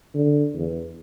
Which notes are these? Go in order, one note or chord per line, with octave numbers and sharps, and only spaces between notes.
D3
E2